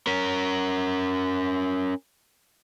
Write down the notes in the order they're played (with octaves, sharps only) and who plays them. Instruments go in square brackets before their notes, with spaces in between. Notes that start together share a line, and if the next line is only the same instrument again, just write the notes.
[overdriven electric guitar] C#4 A#4